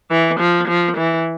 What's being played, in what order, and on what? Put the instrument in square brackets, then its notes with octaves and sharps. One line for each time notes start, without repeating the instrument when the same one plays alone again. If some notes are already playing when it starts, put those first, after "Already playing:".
[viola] E3
F3
F3
E3